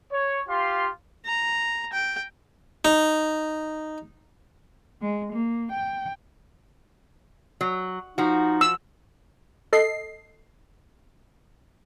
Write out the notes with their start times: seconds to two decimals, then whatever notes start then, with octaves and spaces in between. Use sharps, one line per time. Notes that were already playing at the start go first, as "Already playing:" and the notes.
0.12 C#5
0.49 F4 G4 F5 C6
1.26 A#5
1.93 G5
2.85 D#4
5.01 G#3
5.34 A#3
5.72 G5
7.61 F#3
8.18 F3 D#4 F#4
8.61 E6
9.73 A4 D#5 C7